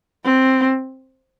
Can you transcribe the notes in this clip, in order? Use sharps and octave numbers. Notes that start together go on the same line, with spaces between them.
C4